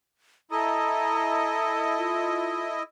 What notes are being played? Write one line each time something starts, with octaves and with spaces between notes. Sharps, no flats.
E4 A4 D#5 A#5
F4